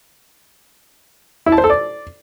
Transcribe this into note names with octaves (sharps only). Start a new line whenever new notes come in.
E4
A5
C5
A4
D5